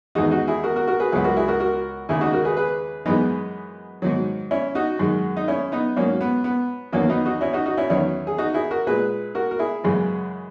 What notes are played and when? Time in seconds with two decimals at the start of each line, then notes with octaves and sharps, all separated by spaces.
0.15 E2 D#3 G#3 D#4 F#4
0.31 D#4 F#4
0.47 E4 G#4
0.64 F#4 A#4
0.76 F#4 A#4
0.87 F#4 A#4
1.00 G#4 B4
1.12 C#2 B2 F#3 G#4 B4
1.24 F#4 A#4
1.37 E4 G#4
1.48 F#4 A#4
1.60 F#4 A#4
2.09 D#2 C#3 G#3 E4 G#4
2.21 D#4 F#4
2.33 F#4 A#4
2.45 G#4 B4
2.57 G#4 B4
3.06 F#2 E3 G#3 B3 D#4
4.02 G#2 D#3 F#3
4.51 C#4 E4
4.75 D#4 F#4
4.99 F#2 D#3 G#3
5.37 D#4
5.48 C#4 E4
5.72 B3 D#4
5.97 G#2 F#3 A#3 C#4
6.21 B3
6.44 B3
6.93 E2 D#3 F#3 A#3 C#4
7.10 B3 D#4
7.25 D#4 F#4
7.41 C#4 E4
7.53 D#4 F#4
7.66 D#4 F#4
7.77 C#4 E4
7.90 E2 D#3 F#3 C#4 E4
8.27 G#4
8.38 D#4 F#4
8.54 E4 G#4
8.71 F#4 A#4
8.87 A#2 G#3 G#4 B4
9.35 F#4 A#4
9.51 A#4
9.59 E4 G#4
9.84 F#2 C#3 E3 G#3